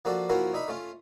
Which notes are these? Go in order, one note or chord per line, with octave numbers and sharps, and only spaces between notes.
F3 A#3 D4 F#4 A4 D5
F3 A#3 C#4 E4 F#4 A#4
D4 D#4 E5 B5
A3 C#4 F4